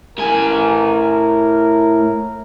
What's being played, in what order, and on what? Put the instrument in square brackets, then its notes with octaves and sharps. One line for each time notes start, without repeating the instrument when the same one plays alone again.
[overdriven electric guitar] A2 G#5 [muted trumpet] A#4